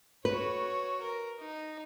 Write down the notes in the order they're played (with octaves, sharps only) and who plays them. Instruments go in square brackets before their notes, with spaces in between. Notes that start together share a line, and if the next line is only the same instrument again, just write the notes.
[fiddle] F#4 C#5 [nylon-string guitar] B4
[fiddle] A#4
D#4